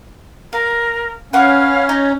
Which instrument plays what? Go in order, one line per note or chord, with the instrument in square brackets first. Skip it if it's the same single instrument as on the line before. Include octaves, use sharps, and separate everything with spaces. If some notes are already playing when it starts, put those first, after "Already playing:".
[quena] A#4 [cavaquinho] F5
[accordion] C#4 [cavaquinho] B4 F#5 C#6 [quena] F5
[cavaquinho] D#4